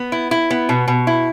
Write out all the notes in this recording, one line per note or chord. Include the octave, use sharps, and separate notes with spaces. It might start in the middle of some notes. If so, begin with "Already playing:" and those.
Already playing: B3
E4
E4
B3
B2
B2
E4